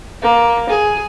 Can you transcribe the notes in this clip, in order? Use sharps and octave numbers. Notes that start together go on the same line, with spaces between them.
A#3
G#4